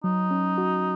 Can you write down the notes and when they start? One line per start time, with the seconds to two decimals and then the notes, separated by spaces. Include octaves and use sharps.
0.04 F#3 D#4
0.31 C#4
0.58 F#4